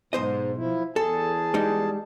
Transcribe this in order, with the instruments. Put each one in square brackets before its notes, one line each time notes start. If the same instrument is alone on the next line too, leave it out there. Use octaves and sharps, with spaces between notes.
[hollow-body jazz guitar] B1 C5 D#5 [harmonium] G#2
[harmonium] F3 E4
[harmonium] E2 G#4 A5 [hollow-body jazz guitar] A4
[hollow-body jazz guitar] G3 G#3 D#4